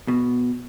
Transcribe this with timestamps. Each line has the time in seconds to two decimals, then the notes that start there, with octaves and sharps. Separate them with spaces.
0.08 B2